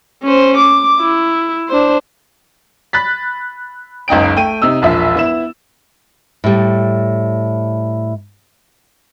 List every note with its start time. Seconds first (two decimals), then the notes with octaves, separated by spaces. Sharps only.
0.23 C#4 C5
0.57 D6
1.00 E4
1.69 D4 C5
2.93 B5 F#6 A6 B6
4.08 F#1 C#2 D#4 G5 D7
4.36 A3 G5 D#7
4.62 C3 D#4 E6
4.82 E1 A#1 F3 E5
5.15 B3 E4 E7
6.44 A2 G3